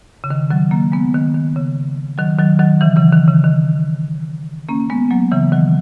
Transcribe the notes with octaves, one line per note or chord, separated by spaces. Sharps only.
C#3
D#3
D#3 F#3
F#3 A#3
G#3 B3
D#3
D#3
C#3
D#3 F#3
D#3 F#3
D#3 F#3
C#3 E3
C#3 E3
D#3
C#3
D#3
A#3 C#4
G#3 B3
F#3 A#3
C#3 E3
D#3 F#3